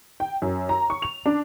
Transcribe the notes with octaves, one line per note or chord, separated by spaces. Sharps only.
G5
F#2
A#5
C#6
F7
D4